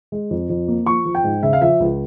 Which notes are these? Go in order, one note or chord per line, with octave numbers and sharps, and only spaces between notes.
G#3
F2
F2
A#3
F3 C#6
F3
G5
G#2
C#3 E5
F5
F3 E5
C#2